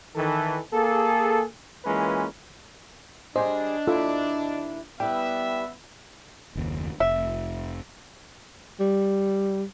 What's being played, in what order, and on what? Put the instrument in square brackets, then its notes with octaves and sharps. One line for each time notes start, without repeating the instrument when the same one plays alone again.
[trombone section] D#3 E3 A4
A#3 G#4 A4
E3 G#3 A#3 C#4 F4 B4
[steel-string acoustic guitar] G3 G4 G#4 [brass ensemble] D4 [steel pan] C5 [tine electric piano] D#5
[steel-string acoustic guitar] D#2 E4 E5 [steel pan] F4 A4
[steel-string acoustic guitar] G3 E4 B4 [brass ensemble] B3 E5 [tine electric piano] G5
[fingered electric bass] F#1 D#2
[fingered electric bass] F1 [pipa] E5
[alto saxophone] G3